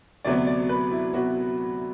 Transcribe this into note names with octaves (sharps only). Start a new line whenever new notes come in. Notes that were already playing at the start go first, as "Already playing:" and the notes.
D2 C3 F#3 B3 D5
D5
B4
E4
C3 F#3 B3 F#4